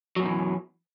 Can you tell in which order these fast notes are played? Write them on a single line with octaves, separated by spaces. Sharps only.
F#3 F#2 B2 D#3 E3